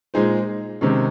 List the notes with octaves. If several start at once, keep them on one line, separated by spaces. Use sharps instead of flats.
A#2 G#3 D#4 G#4 C5
C3 D#3 G#3 C#4